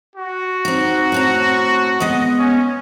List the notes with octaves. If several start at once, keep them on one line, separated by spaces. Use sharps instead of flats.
F#4
C4 D#4
A2 C4 A#5
G#3 B3 D#5
C#4